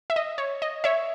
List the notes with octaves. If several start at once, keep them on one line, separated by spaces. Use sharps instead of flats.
E5
D#5
C#5
D#5
C#5 E5